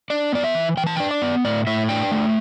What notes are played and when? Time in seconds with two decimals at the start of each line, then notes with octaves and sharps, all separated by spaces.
0.10 D4 D5
0.33 B3 D5
0.44 E5
0.55 E3
0.77 E3 G5
0.87 A5
0.96 D4 G5
1.11 D5
1.22 B3
1.45 A2 D5
1.67 A2 E5
1.89 D4 G5
2.11 A3